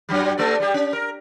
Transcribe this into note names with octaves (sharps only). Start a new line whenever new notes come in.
F#2 F#3 G3
A3 A4 D5
G3 G4
C#4
A#4